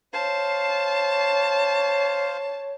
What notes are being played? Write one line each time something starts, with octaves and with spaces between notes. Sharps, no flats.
C5 C#5 F5 A5